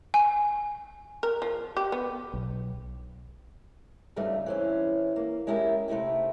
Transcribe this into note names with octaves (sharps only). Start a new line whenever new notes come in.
G#5
A#4
F3
G4
B3
B1
E2 G2 C#3 G3 A3 D#4
E3 C4 C#4
A#3
G#3 C#4 E4 G4 A#4
C3 A3 D#4 E4 G4